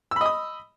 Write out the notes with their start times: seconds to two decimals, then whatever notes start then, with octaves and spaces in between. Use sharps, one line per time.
0.11 E6
0.16 B5
0.21 D#5
0.26 D#6